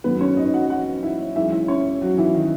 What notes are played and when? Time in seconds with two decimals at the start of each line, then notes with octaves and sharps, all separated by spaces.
0.04 F#2 D#3 F#3 A3 B3 B4
0.20 C#4 C#5
0.37 D#4 D#5
0.54 F#4 F#5
0.70 F#4 F#5
1.03 E4 E5
1.36 F#2 C#3 E3 G#3 E4 E5
1.52 E4 E5
1.68 C#4 C#5
2.02 F#3 F#4
2.18 E3 E4
2.35 D#3 D#4